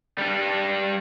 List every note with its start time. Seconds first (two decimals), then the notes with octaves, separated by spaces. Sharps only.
0.18 G3 D4